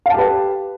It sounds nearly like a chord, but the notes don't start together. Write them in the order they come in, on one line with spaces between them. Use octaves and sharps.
F5 A5 G4 B4